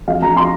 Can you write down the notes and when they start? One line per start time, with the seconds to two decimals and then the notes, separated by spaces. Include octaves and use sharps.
0.08 F2 F5
0.22 F2 A#5
0.37 C6